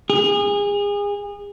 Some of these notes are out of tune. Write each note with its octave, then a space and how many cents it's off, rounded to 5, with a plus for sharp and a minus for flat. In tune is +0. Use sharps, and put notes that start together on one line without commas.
G#4 -30